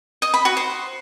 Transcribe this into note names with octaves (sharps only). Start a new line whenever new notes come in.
D#5
B5
F#4
C5